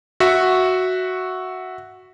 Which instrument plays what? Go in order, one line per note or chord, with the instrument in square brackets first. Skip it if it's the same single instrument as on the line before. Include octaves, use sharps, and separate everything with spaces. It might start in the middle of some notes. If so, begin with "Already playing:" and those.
[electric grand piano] F#4 E5 C#6